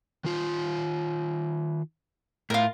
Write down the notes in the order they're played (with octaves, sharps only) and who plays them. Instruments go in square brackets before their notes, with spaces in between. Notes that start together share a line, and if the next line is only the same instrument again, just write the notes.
[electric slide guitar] D#3 F4
[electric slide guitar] A2 [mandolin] F4 A#4